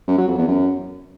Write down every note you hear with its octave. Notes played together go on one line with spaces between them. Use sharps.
F#2
F#3
F2
E2
F#2